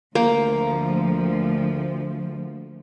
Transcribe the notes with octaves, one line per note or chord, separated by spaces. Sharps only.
D2 F3 A#3